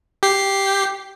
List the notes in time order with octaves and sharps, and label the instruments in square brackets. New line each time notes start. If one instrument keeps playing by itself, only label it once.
[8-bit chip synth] G4 C7